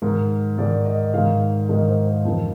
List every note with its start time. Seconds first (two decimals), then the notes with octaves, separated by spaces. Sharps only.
0.02 G#2 D#3 A#4
0.58 G#2 D#3 D5
0.85 D#5
1.14 G#2 D#3 F5
1.69 G#2 D#3 D#5
1.88 C5
2.07 A#4
2.25 F2 D#3